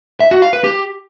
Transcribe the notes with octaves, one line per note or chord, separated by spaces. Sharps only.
E5
F#4
F5
B4
G4